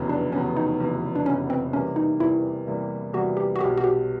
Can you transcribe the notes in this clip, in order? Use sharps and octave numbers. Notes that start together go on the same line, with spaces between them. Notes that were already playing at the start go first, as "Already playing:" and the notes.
Already playing: F1 E2 C#3 F#3 B3
D4
F1 E2 C#3 F#3 B3 C#4
D#4
F1 E2 C#3 F#3 B3
D4
F1 E2 C#3 F#3 B3 C#4
C4
E2 C3 E3 G3 A#3 C#4
D#4
E2 C3 E3 G3 A#3 E4
E2 C3 E3 G3 A#3
E2 C3 E3 G3 A#3 F#4
G4
F#4
B1 B2 F#3 G4
F#4
G4